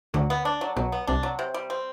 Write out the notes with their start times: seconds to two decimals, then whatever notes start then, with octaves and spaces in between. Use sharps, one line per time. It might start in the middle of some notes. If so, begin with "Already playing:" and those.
0.14 D2 D3 F#3
0.30 B3
0.45 D4
0.61 F#3
0.76 B1 B2 F#3
0.92 B3
1.07 C2 C3 D4
1.23 F#3
1.39 C3
1.54 G3
1.70 C4